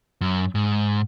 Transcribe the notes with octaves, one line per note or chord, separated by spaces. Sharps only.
F#2
G#2